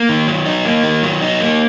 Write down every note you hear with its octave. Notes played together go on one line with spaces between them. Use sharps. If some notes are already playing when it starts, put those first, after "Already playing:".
Already playing: A#3
D#3
F#3
D#4
A#3
D#3
F#3
D#4
A#3